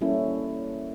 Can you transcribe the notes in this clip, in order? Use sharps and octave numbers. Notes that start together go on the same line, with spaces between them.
G3 A#3 C#4 E4 A4